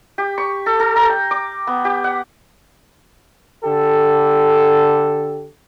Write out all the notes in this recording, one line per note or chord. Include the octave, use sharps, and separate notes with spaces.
G4
C#6
A4
A4
A#5
G5
D6
B3
G4
F#5
D3 G4 A4